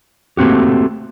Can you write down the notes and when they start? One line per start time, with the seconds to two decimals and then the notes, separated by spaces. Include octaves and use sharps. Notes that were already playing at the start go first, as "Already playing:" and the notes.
0.37 A3 A#3 C4 F#4 G4